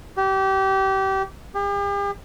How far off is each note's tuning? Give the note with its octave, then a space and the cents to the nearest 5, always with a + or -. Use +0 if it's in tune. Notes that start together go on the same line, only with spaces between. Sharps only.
G4 -25
G4 +45